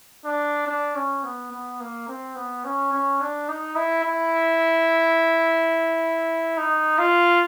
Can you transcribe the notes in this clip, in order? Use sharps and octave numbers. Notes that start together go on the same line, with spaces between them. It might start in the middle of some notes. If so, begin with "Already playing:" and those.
D4
D4
C#4
B3
B3
A#3
C4
B3
C#4
C#4
D4
D#4
E4
E4
D#4
F4